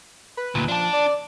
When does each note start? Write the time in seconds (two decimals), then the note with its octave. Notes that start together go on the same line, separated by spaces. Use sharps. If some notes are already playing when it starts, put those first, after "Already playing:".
0.37 B4
0.55 D2 A#2
0.68 F3 D4 A5
0.93 D5